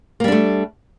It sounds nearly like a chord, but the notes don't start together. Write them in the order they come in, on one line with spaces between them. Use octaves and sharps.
A#3 G3 D4 A3